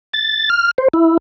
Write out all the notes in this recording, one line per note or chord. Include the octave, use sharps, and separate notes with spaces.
A6
F6
C5
E4